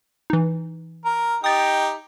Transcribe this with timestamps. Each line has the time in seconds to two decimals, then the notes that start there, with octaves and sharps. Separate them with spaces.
0.30 E3 D#4
1.05 A#4
1.44 D#4 G4 G5 D#6 A6